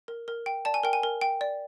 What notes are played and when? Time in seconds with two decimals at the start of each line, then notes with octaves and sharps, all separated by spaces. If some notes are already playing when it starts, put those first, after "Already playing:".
0.08 A#4
0.28 A#4
0.46 G5
0.65 D5 A5
0.74 G#5
0.83 A#4 G5
0.93 G#5
1.03 A#4
1.21 G5
1.41 D5